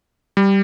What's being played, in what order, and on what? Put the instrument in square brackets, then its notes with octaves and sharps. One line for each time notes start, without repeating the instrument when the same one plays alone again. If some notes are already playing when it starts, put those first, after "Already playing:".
[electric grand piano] G3